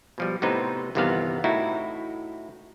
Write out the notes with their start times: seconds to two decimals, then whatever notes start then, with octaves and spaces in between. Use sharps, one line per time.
0.18 B2 F3 G3
0.42 A2 C3 B3 D#4 B4 C5
0.95 G1 E2 C3 D#3 B3 F5
1.44 A2 D#4 E4 F#4